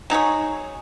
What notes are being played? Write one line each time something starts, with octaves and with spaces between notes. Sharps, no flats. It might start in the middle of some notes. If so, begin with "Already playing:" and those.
F#3 D#4 G#4 C#5